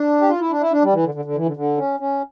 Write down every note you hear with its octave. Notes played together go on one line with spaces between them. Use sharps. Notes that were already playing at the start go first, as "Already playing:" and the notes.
Already playing: D4
G4
F4
E4
D4
E4
D4
G3
E3
D3
D3
D3
E3
D3
D3
C#4
C#4